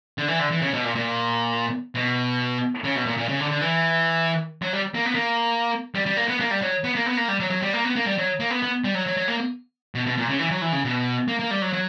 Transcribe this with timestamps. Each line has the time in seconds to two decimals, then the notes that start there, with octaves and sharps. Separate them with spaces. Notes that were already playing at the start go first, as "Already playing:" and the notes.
0.18 D3
0.28 E3
0.39 D3
0.52 E3
0.62 C#3
0.73 B2
0.84 A#2
0.95 A#2
1.95 B2
2.84 C#3
2.95 B2
3.06 A#2
3.17 A#2
3.29 C#3
3.40 D3
3.51 D3
3.61 E3
4.62 F#3
4.73 G3
4.95 A#3
5.06 B3
5.14 A#3
5.95 G3
6.06 G3
6.17 A#3
6.29 B3
6.40 A#3
6.51 G3
6.62 F#3
6.84 B3
6.95 A#3
7.06 B3
7.17 A#3
7.28 G3
7.40 F#3
7.50 F#3
7.62 G3
7.73 A#3
7.84 B3
7.96 A#3
8.07 G3
8.18 F#3
8.40 A#3
8.50 B3
8.62 B3
8.84 G3
8.95 F#3
9.06 F#3
9.17 F#3
9.28 A#3
9.95 B2
10.06 B2
10.18 A#2
10.29 C#3
10.39 E3
10.51 F#3
10.62 E3
10.72 C#3
10.85 B2
11.28 A#3
11.40 A#3
11.51 G3
11.62 F#3
11.73 F#3